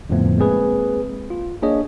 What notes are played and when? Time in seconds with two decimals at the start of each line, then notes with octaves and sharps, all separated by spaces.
0.09 F2 A2 D3 F3 A3 B3
0.38 G#3 A#3 C4 G#4 B4
1.30 F4
1.63 A#3 D4 G#4 C#5 D#5